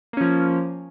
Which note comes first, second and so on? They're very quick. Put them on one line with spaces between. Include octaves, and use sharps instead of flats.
A#3 C#4 F3